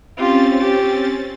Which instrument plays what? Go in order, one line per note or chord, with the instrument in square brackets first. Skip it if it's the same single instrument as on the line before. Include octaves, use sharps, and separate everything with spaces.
[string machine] C4 C#4 A6 [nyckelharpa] F4 G4
[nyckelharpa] G4